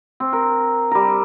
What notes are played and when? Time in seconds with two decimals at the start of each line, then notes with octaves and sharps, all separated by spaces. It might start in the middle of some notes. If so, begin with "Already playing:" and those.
0.20 C4
0.33 A#4
0.91 G3 A#4